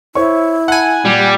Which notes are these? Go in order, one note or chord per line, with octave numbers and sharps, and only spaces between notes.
E4 C5 C#5 C#6
F#5 G#5 A5 B5 F#7
A#2 G3